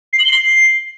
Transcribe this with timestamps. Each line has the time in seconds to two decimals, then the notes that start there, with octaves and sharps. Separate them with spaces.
0.13 C7
0.19 F#7
0.25 G7
0.31 C7